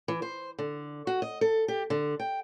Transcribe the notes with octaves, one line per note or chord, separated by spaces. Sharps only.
E3
C5
D3
F#4
D#5
A4
G4
D3
G5